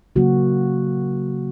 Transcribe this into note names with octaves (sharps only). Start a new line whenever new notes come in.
C#3 F#3 A#3 F#4